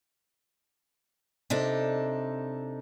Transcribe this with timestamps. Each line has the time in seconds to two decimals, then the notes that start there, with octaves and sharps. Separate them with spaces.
1.50 C3 D4 D#4 A4